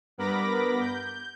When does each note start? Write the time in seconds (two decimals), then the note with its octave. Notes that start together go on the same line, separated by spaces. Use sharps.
0.18 G2 B3 A#4 B5 D6 A#6
0.81 G6